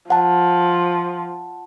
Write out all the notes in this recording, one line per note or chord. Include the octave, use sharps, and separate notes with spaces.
F3 F#5 A5